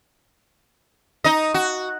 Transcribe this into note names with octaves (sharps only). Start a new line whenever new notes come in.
D#4 D#5
F#4